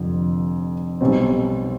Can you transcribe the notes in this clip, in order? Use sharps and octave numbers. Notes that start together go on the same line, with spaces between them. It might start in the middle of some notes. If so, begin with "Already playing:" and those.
Already playing: F1 F2 D3
B1 B2 G3 C4